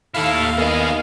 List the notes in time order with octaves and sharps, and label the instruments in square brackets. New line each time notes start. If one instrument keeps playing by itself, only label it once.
[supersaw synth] D#2 F5 [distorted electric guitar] E4 A4
[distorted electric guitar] B3 G#4 [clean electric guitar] A#4 D#5